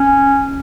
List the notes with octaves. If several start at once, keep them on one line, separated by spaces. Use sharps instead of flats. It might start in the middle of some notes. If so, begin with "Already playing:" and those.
Already playing: C#4